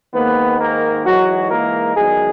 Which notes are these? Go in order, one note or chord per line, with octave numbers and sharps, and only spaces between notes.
G#2 D#3 A#3 B3 B4
A#3 A#4
G#2 E3 F#3 G#3 F#4
A#3 A#4
E2 D#3 F#3 G#3 G#4